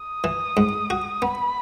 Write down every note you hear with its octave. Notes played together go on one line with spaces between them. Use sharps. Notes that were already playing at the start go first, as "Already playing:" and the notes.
Already playing: D#6
E3
G#2
F#4
B3 B5